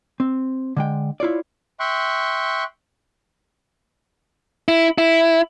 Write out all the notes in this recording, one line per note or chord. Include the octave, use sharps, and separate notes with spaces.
C4
D3 G#3 G5
E4 F4 C#5 D5
E5 G5 C6 C#6 F#6
E4
E4